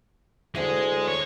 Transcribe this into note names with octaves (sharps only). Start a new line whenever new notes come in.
D2 G#3 E4 E5
C#5